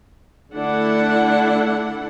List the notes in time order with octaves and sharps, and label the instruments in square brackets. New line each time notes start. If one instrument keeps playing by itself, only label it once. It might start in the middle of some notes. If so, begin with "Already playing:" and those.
[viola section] D3 A3 D4 E4 A4 F#5